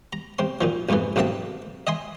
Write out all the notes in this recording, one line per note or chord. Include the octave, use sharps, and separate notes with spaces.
A#5
C3 C4 C6
A#2 D#3 F3
A#1 F2 G#2 C3 E3
B1 G#2 A#3 C4 E5 A5
D#5 E5 G#5 C6